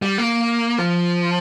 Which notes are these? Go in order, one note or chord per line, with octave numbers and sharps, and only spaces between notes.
G3
A#3
F3